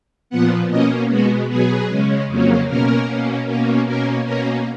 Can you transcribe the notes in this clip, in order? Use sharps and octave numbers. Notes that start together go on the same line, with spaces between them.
A#2 F3 B3 F#5
B2 A#3 C#4 D#5
B2 G#3 B3 F#4
B2 F#3 B3 G#4
C#3 G#3 C#4
F2 C#3 F#3 A#3 C#4
B2 A#3 C#4 A#4
B2 A#3 C#4
B2 A#3 C#4
B2 A#3 C#4 A#4
B2 A#3 C#4 A#4